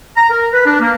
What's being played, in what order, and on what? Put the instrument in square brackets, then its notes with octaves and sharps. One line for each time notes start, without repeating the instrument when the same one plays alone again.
[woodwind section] A#5
A#4
B4
D4
A#3